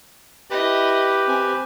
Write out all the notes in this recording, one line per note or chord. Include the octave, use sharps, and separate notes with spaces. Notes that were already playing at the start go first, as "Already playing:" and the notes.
E4 G4 B4 D#5
C4 G#5